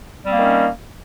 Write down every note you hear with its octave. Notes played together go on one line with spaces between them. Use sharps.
D#3 G3 A#3 C4 C#4